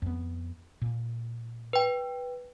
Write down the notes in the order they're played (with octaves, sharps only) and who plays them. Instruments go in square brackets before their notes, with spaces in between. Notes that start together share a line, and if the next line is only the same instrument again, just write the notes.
[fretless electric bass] F2 B3
A#2
[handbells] B4 G5